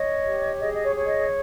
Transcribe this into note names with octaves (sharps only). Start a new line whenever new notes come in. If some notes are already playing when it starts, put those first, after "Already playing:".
Already playing: C#5 D#5
G4
G#4 D#5
D#5
C#5
C#5
D#5